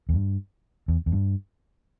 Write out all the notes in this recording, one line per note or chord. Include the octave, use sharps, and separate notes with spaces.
E2
G2
E2
E2
G2